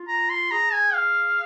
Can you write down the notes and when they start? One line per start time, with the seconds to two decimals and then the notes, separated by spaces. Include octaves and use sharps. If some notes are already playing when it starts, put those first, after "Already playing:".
Already playing: F4
0.08 A#5
0.30 C6
0.51 G#4 A#5
0.73 G#5
0.94 F5